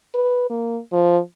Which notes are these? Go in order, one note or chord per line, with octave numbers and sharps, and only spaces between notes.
B4
A#3
F3